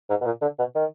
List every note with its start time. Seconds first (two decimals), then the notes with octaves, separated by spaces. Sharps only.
0.10 G#2
0.21 B2
0.26 A#2
0.42 D3
0.59 B2
0.75 D#3